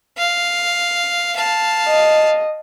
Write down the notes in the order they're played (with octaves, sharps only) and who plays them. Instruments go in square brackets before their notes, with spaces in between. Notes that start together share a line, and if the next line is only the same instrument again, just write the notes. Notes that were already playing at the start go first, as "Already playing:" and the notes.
[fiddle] F5
F5 A5
[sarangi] D#5